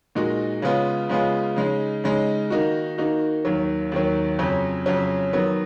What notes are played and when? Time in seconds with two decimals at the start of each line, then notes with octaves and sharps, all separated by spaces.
0.15 A#2 G#3 D#4 F#4
0.62 C#3 G#3 B3 F4
1.09 C#3 G#3 B3 F4
1.56 C#3 G#3 D#4
2.04 C#3 G#3 D#4
2.50 D#3 A#3 D#4 F#4
2.98 D#3 A#3 D#4 F#4
3.45 D#2 D#3 F#3
3.92 D#2 D#3 F#3
4.39 F2 C#3 F#3 C#4
4.86 F2 C#3 F#3 C#4
5.33 D#3 F#3 B3